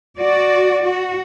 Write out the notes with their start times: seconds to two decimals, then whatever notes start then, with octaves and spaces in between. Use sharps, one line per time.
0.20 F#4 D5
0.84 F#4